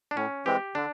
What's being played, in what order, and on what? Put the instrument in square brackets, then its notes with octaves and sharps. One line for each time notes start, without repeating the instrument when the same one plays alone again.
[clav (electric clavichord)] D4
[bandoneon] A2 [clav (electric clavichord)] C#4
[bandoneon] E3 G#3 C4 [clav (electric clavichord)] G4
[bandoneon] D3 [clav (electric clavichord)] D4